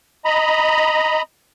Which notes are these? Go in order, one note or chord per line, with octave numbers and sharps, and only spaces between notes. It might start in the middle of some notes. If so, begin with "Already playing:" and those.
D#5 A#5 B5